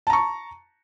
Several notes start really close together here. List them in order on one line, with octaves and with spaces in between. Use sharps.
A5 A#5 C#6